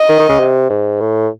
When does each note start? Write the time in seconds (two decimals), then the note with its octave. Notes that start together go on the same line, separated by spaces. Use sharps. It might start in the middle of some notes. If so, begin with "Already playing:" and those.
Already playing: D#5
0.09 D#3
0.19 D#3
0.29 C#3
0.39 C3
0.69 G#2
1.00 A2